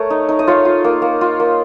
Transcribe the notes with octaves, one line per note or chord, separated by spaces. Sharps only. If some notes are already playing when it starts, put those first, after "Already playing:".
Already playing: A3 A#4 C#5
D#4
D#4
D#5
F4 C#5 F5
F4
A#3
A#3
F4
A#3